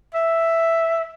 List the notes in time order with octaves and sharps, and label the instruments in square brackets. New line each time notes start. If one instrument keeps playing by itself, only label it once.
[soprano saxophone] E5